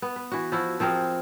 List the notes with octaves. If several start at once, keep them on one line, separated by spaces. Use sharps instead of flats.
B3
B4
E3 F#4
F3 E4 F#4
F3 C4 G#4 A#4